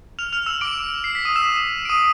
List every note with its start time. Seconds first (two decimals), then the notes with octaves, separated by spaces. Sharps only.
0.19 F6 F7
0.33 F6 F7
0.46 E6 E7
0.61 D6 D7
1.04 C7
1.15 B6
1.25 D#6 D#7
1.36 E6 E7
1.85 D7
1.89 D#6 D#7